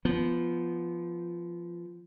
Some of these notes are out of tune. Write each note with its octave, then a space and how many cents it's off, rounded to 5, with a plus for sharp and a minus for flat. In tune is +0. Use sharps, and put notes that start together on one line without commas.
F3 -15 B3 +0